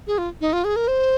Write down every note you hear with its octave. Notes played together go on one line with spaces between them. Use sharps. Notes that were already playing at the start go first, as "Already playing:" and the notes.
G#4
F4
D#4
F4
G#4
A#4
C5